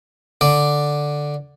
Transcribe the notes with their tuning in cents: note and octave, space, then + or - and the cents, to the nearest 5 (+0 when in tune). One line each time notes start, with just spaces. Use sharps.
D3 +0 D5 +0